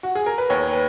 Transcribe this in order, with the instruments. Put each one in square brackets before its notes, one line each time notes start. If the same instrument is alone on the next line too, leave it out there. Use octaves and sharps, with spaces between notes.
[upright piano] F#4
G#4
A#4
B4
D#2 C#5
B4